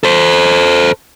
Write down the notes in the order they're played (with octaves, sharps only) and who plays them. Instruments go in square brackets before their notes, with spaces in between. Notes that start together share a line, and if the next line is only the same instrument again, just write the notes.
[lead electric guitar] A4 C5